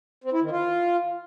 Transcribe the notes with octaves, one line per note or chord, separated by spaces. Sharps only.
C4
E4
D#3
F4